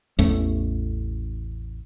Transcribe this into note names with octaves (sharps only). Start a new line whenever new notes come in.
A1 E2 A3 C#4